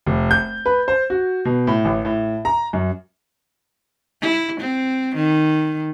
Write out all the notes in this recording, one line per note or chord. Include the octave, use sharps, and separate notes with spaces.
F1
G6
B4
C5
F#4
B2
A2
A1
A2
A#5
F#2
E4
C4
D#3